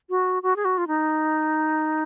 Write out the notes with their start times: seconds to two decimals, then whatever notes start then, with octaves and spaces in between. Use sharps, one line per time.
0.10 F#4
0.43 F#4
0.56 G#4
0.65 F#4
0.78 F4
0.87 D#4